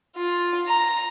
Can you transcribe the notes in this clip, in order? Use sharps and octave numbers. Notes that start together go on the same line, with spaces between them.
F4
A#5